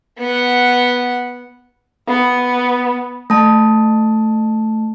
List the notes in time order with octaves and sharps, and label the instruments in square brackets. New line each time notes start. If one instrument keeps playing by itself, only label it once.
[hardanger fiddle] B3 F#5
[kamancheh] B3
[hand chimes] A3 A5